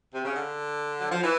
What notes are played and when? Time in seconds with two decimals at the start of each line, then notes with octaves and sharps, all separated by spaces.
0.14 C3
0.25 C#3
0.36 D3
0.99 F#3
1.11 F3
1.23 E3